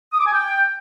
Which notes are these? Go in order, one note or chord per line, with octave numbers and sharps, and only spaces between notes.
D#6
D6
G#5
G5